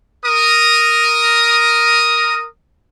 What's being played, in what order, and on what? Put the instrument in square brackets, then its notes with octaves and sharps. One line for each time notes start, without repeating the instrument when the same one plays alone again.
[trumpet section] A#4 D#6